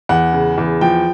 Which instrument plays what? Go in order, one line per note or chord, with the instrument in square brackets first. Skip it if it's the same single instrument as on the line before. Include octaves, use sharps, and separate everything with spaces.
[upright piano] E2 F#5
C#3
E2
F3 G5